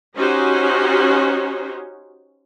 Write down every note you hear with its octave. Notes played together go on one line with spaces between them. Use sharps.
C#4 D#4 F#4 G4 C5 C#5